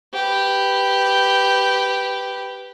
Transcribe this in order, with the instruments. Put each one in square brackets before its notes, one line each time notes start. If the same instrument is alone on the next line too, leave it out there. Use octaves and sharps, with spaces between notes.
[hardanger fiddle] G4 B4